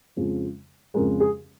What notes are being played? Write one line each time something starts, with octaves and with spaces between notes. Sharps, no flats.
F2 C#3 F3 G#3
F2 C#3 F3 G#3 A#4
G#4